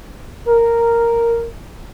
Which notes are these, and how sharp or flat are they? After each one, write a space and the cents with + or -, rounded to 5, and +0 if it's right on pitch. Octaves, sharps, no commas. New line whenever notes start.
A#4 -5